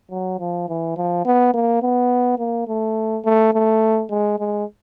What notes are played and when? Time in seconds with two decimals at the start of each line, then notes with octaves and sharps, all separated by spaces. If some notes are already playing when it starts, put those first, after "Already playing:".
0.11 F#3
0.40 F3
0.69 E3
0.96 F3
1.25 B3
1.54 A#3
1.82 B3
2.39 A#3
2.68 A3
3.24 A3
3.53 A3
4.10 G#3
4.39 G#3